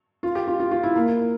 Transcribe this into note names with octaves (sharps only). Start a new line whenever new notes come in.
F4
G4
F4
F4
F4
E4
A#3